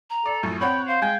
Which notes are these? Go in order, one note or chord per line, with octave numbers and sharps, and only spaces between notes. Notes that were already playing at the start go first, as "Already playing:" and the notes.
A#5
A4 D5
A#1 F#2 A2
C4 C#5 F#5 G5 B5
C5 F5
G#3 G5 G#5 G#6